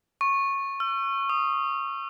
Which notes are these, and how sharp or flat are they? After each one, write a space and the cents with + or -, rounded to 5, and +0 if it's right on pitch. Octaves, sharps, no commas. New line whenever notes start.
C#6 -15
E6 +45
D#6 -5